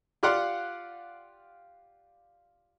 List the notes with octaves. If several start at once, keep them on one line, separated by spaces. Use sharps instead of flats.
F4 G4 D5 F5 F#5 C6